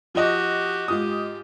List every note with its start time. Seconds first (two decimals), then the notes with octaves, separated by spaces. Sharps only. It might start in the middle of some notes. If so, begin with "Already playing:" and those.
0.15 F3 F#4 G4 D#5
0.88 G#2 F4 G4 D#6